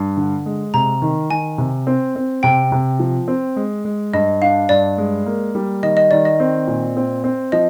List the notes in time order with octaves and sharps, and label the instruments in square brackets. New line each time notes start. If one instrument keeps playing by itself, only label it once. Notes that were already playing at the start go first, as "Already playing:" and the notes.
Already playing: [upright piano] G2
D3
G#3
[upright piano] C3 [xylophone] A#5
[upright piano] D#3
[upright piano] D#3 [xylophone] G#5
[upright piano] C3
C4
C4
[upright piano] C3 [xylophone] G5
[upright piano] C3
F3
C4
G#3
G#3
[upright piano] G2 [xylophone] D#5
[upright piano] D4 [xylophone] F5
[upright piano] G2 [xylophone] D5
[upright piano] G#3
A#3
G3
[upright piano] D#3 [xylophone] D#5
[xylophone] D#5
[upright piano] D#3 [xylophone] D5
[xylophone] D#5
[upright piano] C4
A#2
C4
C4
[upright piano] F3 [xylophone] D#5